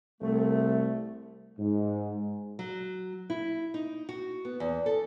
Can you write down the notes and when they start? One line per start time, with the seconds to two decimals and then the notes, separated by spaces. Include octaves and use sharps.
0.21 C2 A3
1.59 G#2
2.59 F#3
3.30 E4
3.74 D#4
4.09 F#4
4.45 B3
4.60 E2
4.86 A4